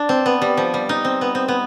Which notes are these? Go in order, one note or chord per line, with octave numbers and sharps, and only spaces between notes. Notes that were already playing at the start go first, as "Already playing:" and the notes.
Already playing: D4
C4
B3
G3
F3
G3
D#4
C4
B3
C4
B3